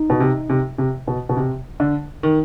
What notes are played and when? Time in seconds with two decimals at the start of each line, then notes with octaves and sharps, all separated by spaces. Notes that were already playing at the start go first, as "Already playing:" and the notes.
Already playing: D#4
0.10 B2
0.20 C3
0.49 C3
0.78 C3
1.08 B2
1.29 B2
1.36 C3
1.80 D3
2.23 D#3